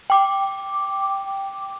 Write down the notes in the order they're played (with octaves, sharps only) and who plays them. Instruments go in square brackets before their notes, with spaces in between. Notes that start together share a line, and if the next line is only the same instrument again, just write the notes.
[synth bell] G5 D6